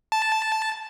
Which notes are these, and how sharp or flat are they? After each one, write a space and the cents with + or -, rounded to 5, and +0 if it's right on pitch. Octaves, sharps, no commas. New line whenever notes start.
A5 -5